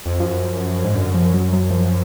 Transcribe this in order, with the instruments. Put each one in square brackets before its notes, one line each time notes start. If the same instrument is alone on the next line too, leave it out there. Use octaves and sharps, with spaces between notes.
[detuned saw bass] F2
[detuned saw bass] F#2 [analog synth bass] F3
[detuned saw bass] G#2
[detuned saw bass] F#2 [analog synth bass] D3
[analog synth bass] F3
F#3
F#3
F3